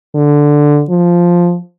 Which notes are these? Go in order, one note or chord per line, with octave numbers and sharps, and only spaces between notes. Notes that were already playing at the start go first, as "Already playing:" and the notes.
D3
F3